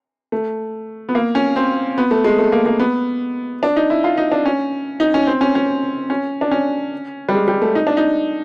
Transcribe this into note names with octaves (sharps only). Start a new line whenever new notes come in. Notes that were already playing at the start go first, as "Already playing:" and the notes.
A3
B3
A#3
C#4
C4
B3
A3
G#3
A3
A#3
A#3
B3
D4
D#4
E4
F4
D#4
D4
C#4
D#4
C#4
C4
C#4
C#4
C#4
D4
C#4
G3
G#3
G3
A3
D#4
D4
D#4